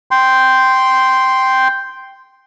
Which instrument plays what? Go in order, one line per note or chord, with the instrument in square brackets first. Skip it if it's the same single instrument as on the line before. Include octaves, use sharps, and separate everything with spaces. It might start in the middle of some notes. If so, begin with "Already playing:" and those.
[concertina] G5 C6